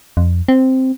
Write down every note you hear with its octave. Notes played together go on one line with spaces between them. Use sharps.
F2
C4